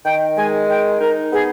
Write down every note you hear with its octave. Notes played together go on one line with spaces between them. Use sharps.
D#3 G5
G#3 G#5
D#3 G5
D#4 A#4
B3 G#4